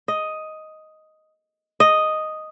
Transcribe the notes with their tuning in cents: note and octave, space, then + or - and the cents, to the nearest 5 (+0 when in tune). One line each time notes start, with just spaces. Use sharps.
D#5 +5
D#5 +0